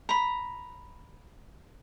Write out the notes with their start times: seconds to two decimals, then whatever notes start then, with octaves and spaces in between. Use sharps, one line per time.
0.09 A#5 B5